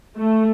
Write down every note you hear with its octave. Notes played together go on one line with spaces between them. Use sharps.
A3